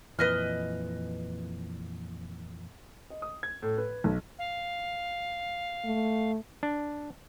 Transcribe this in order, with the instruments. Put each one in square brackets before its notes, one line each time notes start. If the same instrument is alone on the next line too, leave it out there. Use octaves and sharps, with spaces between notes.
[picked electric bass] F2 A#2 E3 [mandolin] B4 D#5 F6
[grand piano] D#5
D#6
G#6
A2
B4
B1
[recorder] F5
[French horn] A3
[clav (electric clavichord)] D4